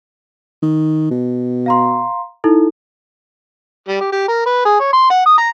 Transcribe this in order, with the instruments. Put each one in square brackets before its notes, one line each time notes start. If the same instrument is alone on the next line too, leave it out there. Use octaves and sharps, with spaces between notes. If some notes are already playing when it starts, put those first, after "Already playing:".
[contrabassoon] D#3
B2
[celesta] F5 A#5 C6
D#4 E4 A4
[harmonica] G3
G4
G4
A#4
B4
G#4
C#5
C6
F#5
D#6
A#5